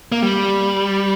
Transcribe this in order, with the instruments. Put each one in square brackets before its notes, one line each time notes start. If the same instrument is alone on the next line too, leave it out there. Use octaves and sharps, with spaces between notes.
[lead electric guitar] A#3
G3